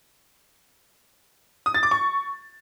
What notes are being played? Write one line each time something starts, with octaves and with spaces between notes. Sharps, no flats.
D#6
A6
D6
C#6